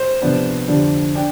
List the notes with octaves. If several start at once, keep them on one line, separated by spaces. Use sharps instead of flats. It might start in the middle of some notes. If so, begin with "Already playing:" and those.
Already playing: C5
C3 F3 B3 D4
F2 D3 G3 D4
D4 G5